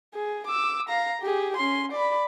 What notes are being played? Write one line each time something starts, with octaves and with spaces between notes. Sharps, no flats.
G#4
D6 E6
F5 A#5
G4 G#4
C#4 C6
D5 B5